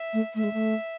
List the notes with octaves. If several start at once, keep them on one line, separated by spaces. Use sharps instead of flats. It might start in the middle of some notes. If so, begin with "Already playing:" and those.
Already playing: E5
A3
A3 E5
G#3
A3